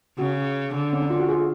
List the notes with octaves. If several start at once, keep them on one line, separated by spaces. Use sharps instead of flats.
C#3 F#4
D3
C#4
D4
F4
F#4
F4 G#4